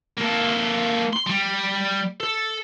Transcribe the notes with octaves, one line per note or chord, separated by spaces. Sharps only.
A#3 A4
C6
G3
A4